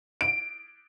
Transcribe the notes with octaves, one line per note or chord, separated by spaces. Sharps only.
D7